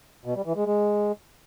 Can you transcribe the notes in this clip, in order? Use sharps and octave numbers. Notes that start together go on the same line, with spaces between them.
B2
G3
E3
G#3
G#3